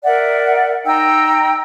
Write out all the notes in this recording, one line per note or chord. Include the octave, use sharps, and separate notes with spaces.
A#4 D5 E5 F#5
D#4 G5 A#5 E6